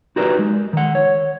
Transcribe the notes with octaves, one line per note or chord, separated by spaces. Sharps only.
D#4 F#4 G4 A#4 B4 D5
G#3
D#3 F#5
C#5